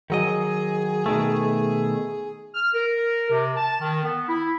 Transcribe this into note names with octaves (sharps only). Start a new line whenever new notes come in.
D#3 F#3 G#4 D#5
B2 D#3 A3
F6
A#4
C3
A5
D#3
B3
E4